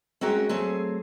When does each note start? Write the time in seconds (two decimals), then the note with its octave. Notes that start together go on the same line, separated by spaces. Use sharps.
0.21 G#3 C4 C#4 F#4 A#4 E5
0.49 F#3 A3 C4 G#4